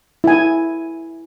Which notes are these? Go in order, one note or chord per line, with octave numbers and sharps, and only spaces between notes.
E4 G#5